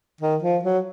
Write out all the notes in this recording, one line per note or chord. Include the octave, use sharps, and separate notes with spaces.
D#3
F3
F#3